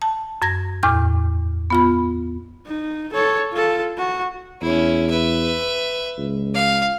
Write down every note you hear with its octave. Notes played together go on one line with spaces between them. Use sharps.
A5
F#2 G#6 A#6
E2 A2 D6 F6 G6
B3 F4 B5
D#4
A4 C#5
F4 A4
F#4
E2 C#4 E4
B4 E5
C#2
F5